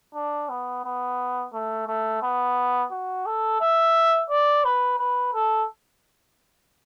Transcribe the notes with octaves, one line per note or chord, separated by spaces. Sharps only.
D4
B3
B3
A3
A3
B3
F#4
A4
E5
D5
B4
B4
A4